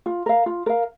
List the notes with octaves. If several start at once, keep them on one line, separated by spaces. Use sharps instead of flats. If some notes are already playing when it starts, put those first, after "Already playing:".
F4
A#4 F5
F4
A#4 F5